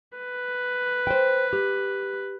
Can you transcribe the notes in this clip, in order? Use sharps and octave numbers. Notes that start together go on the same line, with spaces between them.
B4
C5 G5
G4